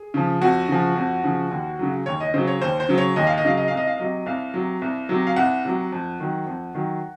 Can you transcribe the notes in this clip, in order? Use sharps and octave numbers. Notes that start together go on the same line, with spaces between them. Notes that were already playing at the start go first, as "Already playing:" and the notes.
Already playing: G#4
C#3 F3
F2 F#4
C#3 F3
F2
C#3 F3
D#2
C#3 F#3
D#2 C#5
D#5
C#3 F#3 C5
C#5
D#2 C5
C5
C#3 F#3
C#5
D#2 D#5
F5
D#5
C#3 F#3 F5
D#5
C2 F5
D#5
F5
C3 F#3 D#5
C2 F5
C3 F#3
C2
C3 F#3
F5
C2 F#5
C3 F#3
F2
D#3 F#3
F2
D#3 F#3